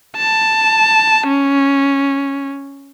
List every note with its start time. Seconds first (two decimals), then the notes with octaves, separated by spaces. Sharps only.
0.17 A5
1.28 C#4